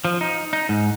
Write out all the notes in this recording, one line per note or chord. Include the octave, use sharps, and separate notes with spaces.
F3
D#4
D#4
G#2